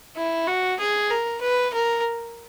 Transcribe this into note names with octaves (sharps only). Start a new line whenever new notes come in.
E4
F#4
G#4
A#4
B4
A#4